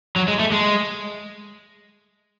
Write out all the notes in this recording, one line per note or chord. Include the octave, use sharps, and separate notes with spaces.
F#3
G#3
A3
G#3